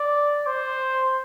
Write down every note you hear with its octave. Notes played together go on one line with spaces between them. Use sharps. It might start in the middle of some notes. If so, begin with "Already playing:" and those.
Already playing: D5
C5